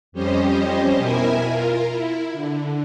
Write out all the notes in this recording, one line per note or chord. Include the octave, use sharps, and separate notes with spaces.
F2 G3 C#4 G4 C5 D#5
B2 E4 A#4 E5 G#5
F4 A#4
E4
D3